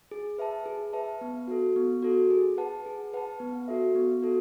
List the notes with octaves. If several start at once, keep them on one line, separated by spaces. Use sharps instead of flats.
G#4
B4 E5 A5
G#4
B4 E5 A5
B3
F#4 A4
B3
F#4 A4
G#4
B4 F#5 A5
G#4
B4 F#5 A5
B3
F#4 A4 E5
B3
F#4 A4